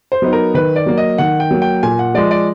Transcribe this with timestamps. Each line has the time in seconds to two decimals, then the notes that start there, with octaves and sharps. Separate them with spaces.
0.12 C5
0.22 F#3 B3 D#4
0.33 A#4
0.54 D#3 B4
0.76 D5
0.86 F#3 A#3
0.98 D#5
1.18 D#3 F#5
1.40 G5
1.51 F#3 A#3
1.62 G5
1.83 A#2 G#5
1.99 F#5
2.14 F3 G#3 D5
2.31 D5